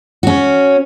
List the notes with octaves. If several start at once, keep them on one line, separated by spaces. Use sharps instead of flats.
C#4 F#4